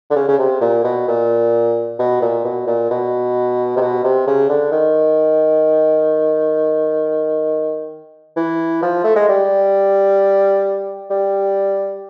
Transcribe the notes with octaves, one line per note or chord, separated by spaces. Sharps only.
D3
C#3
C#3
C3
A#2
B2
A#2
B2
A#2
B2
A#2
B2
C3
B2
C3
C#3
D3
D#3
E3
F3
A3
G#3
G3
G3